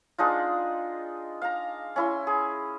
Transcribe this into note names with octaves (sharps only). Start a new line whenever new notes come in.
G#3 D4 D#4 F4
F5 A#5
C#4 E4 C6
G#4